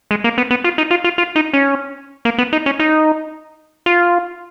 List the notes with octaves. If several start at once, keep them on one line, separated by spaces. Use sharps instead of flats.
G#3
A#3
B3
B3
F4
D#4
F4
F4
F4
D#4
C#4
A#3
B3
D#4
C#4
D#4
F4